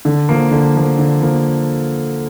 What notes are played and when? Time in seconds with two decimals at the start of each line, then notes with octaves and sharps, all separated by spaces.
0.05 D3
0.29 F3 A#3
0.51 D3
0.76 F3 A#3
0.98 D3
1.22 F3 A#3